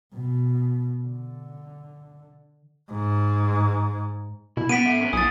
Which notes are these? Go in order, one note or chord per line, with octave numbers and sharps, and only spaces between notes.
B2
D3
G#2
B2 E4
B3 C#4 F#5 B6 D7 D#7
G#2 A4 E5
C#4 A#4 B4
B1 A#3 E4 G#5 D#6 A6